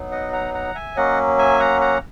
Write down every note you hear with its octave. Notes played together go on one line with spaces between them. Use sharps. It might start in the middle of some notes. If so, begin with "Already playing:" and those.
Already playing: F#3 B3 D#4
D#5 F#5
F#5 A#5
F#5 A#5
E5 G#5
F#3 A#3 C#4 D#5 F#5
E5 G#5
F#5 A#5
F#5 A#5